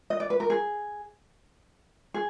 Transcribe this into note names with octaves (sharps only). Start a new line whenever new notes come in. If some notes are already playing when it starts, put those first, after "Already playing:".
D#5
D5
B4
A#4
G#4
G#4